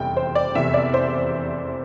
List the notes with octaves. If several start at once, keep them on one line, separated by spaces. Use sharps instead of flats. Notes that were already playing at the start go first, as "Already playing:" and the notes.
Already playing: F1 E2 E3 G3 G5
C5
D5
F1 E2 C3 E3 E5
D5
C5